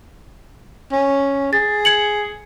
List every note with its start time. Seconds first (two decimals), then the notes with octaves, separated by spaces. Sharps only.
0.92 C#4
1.53 G#4 A6
1.85 G#6 C#7 F#7